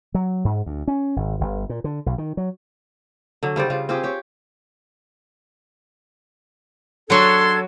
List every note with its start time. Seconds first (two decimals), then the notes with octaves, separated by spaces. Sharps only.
0.15 F#3
0.45 G#2
0.66 D2
0.88 C#4
1.16 G#1
1.41 G1
1.69 A#2
1.84 D3
2.06 B1
2.18 D#3
2.37 F#3
3.43 D3 F#3
3.56 C#3 G3 C5 D5
3.70 C#3 G3 F4
3.89 C4 F4 G4 G#4
4.03 G4 C#5
7.10 F#3 D4 A4 C#5 C6 G#6